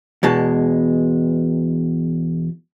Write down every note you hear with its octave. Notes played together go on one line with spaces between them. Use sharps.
E2 B2 G#3 A5